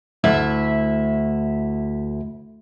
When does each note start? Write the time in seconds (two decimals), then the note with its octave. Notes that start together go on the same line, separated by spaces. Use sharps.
0.24 D2 E4 E5